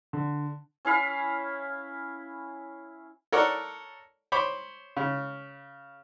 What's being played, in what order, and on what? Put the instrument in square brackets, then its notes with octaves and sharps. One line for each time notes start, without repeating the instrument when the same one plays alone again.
[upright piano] D3
[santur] C#4 E4 F5 B5
[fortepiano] A4 A#4 C#5 D5 F#5
C5 C#5 B5 D6
C#3